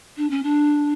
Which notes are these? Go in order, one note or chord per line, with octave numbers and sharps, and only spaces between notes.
D4
C#4
D4